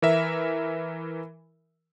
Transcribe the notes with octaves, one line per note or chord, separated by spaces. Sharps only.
E3 A#4 E5